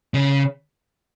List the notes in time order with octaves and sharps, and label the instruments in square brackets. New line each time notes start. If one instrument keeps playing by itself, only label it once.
[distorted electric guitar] C#3